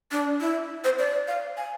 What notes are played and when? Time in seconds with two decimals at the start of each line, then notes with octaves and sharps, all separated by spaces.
0.12 D4
0.40 E4
0.84 C5
0.99 D5
1.28 F5
1.57 G#5